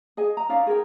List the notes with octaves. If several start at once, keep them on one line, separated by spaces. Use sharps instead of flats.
G#4 D#5 G#5
A#5
C#4 D#4 D5 F5
G#4 A#4 G5